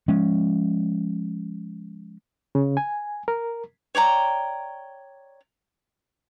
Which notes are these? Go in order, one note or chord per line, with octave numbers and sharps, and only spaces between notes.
F3 G#3 C#4
C#3
G#5
A#4
C#5 D5 G5 A#5